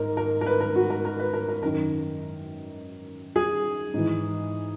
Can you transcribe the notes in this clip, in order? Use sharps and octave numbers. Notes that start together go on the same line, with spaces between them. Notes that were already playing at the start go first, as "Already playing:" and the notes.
Already playing: G#2 A#4
A#4
A#4
B4
A#4
F#4
A#4
A#4
B4
A#4
A#4
F#2 D#3 A#4
G#4
G#2 E3